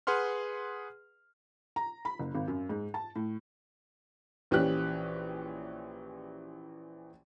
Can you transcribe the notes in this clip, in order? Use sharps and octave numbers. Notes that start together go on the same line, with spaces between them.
G#4 B4 F#5 C6 F6
A#5
B5
F#1
G#1
F#2
G#2
A5
A2
A#1 E3 C#4 G4 F#6